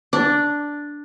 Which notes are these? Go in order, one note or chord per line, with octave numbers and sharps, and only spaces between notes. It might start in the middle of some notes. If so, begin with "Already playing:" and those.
D4